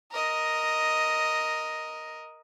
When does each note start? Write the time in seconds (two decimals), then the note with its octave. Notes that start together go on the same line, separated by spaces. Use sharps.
0.12 A#4 D#5